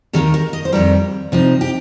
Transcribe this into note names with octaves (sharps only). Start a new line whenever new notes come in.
D#2 D#3 A#3 G4
A#4
D#5
C5
F2 D#3 G3 A#4
C3 F3 D#4
G4